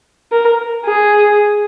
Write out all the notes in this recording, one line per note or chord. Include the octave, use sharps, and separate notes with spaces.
A#4
G#4